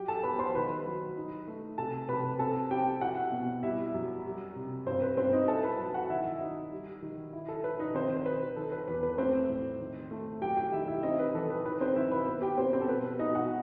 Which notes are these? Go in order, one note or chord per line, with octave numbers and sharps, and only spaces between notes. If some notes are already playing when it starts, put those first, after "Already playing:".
Already playing: F#3 G4 G5
A4 A5
B3 B4 B5
C5 C6
D#3 B4 B5
F#3
D#4
A3
C3 A4 A5
C3 B4 B5
C4 A4 A5
C4 G4 G5
E4 F#4 F#5
B2
G3 E4 E5
F#2
G3
C3
G2 C4 C5
B4
G2 C4 C5
D#4 D#5
E4 A4 A5
B4 B5
F#3
F#4 F#5
D#3 E4 E5
D#4
G3
D#3
E4
A4
E4 B4
D#4 D#5
D#3 C4 C5
C5
D#3 B4
D#3 A4
B4
E2 B4
B4
A3 C4 C5
A2
D#3
A3
F#3 G4 G5
G4 G5
D#3 E4 E5
E4 E5
C4 D#4 D#5
B4
E3 A4
B4
D#4 B4
C4 C5
D#3 E4 E5
B4 B5
B3
G4 G5
B3 C4 C5
C4 C5
A4
B2 B4
B2 D#4 D#5
F#4 F#5